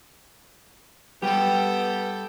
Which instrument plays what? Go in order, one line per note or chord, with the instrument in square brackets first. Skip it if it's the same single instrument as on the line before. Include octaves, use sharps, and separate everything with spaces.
[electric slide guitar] G3 G4 [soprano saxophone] B3 [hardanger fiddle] A4 G5